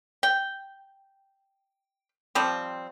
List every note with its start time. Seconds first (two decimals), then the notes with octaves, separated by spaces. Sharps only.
0.23 G5
2.35 F3 G3 C4